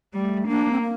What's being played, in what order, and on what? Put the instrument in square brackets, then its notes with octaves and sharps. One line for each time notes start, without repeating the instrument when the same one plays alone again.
[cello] G3 [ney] A3
[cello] A#3 [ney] D4
[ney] C4
A#3